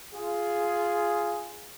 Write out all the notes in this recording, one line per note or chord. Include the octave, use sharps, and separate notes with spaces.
F4 G#4